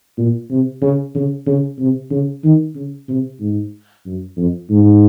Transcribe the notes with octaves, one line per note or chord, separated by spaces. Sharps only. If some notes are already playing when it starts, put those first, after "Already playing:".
A#2
C3
C#3
C#3
C#3
C3
C#3
D#3
C#3
C3
G#2
F#2
F2
G#2